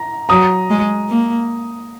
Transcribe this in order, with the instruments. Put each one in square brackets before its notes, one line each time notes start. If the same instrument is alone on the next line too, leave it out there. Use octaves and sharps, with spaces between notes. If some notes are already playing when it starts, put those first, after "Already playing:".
Already playing: [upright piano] A#5
[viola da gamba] F#3 [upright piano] A#5 D#6
[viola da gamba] G#3
A#3